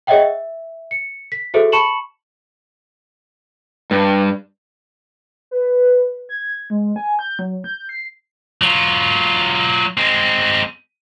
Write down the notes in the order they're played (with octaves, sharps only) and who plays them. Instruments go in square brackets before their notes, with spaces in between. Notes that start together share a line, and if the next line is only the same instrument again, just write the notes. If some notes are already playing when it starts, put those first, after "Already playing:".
[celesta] G#4 C#5 D#5 E5 F#5 G5
E5
C#7
B6
F#4 G#4 A4 C5 E5
A5 B5 C#6 C#7 E7 F#7
[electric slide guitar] G2
[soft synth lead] B4
G#6
G#3
G#5
G6
F#3
G6
C7
[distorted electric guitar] F#3 F4
G#3 C4